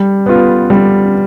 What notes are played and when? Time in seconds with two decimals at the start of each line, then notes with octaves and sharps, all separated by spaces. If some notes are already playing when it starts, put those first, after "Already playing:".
Already playing: G3
0.26 B3 F4
0.70 G3